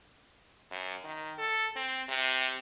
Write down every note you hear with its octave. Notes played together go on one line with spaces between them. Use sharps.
F#2
D#3
A4
C4
C3